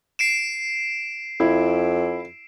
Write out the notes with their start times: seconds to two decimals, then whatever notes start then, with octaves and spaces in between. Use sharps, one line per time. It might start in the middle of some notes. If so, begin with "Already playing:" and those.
0.19 C7 D7 E7
1.40 F2 E4